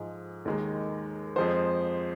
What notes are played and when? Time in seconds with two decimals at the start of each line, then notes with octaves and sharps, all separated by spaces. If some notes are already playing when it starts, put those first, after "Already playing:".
Already playing: G#2 F3 G#3
0.45 D#2 D#3 G#3
1.36 F2 F3 G#3 C5